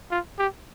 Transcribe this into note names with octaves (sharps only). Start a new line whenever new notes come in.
F4
G4